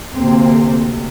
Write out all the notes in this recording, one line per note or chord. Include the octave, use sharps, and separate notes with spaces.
D2 C3 A#3 C4